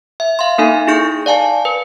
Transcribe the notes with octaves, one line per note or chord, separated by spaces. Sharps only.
E5
F5 C6
A#3 D#4 A4 E5 G#5
D#4 E4 G#4 C#6 G6
D5 F5 G#5 A5
B4